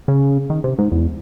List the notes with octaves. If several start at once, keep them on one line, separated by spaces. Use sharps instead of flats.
C#3
D#3
C3
G#2
E2